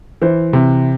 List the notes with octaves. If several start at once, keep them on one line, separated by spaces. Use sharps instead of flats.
E3 C5
C3